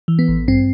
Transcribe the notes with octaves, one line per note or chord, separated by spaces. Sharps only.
E3
B3
A1
G2 C4